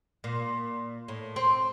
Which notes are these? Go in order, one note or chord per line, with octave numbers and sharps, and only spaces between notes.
A#2
A2
C4